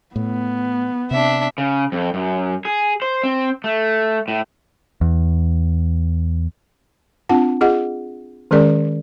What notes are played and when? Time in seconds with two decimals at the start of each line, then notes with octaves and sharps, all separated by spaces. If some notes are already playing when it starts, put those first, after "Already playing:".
0.16 A2 B3
1.11 C3 D4 E5
1.58 C#3
1.92 F2
2.14 F#2
2.65 G#4
3.02 C5
3.23 C4
3.64 A3
4.28 A2
5.01 E2
7.29 C4 D4 F4 F#5 A5
7.61 F4 G#4 D#5 F#5
8.51 D#3 G#3 C#4 G#4 A#4 D5